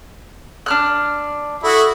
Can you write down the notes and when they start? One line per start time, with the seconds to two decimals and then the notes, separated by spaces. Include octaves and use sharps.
0.66 D4 F6 F#6
1.63 E4 F#4 A4 D#6